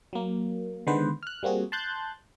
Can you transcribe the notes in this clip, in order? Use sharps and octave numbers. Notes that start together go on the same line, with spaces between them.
F#3 A#3
D3 D#3 G#3 B3 B4 C5
F6 F#6
G3 A#3 C4 F#4 G#4
A5 C6 F#6 G6 A6